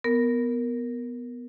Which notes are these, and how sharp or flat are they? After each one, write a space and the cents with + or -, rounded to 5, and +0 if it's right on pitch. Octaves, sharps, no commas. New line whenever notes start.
B3 +0 A#4 +0